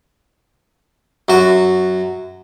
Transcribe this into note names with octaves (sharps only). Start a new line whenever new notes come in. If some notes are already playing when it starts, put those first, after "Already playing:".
F#2 F#4